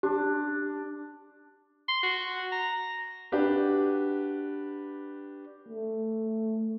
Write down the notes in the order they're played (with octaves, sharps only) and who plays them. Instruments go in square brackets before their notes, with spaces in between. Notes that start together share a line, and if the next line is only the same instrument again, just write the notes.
[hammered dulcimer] D4 [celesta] G4
[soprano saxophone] C6
F#4
A#5
[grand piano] D4 F#4 G4 B4
[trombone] A3